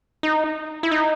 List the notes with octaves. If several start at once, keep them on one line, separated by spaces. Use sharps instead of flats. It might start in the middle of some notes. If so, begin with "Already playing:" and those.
D#4
E4
D#4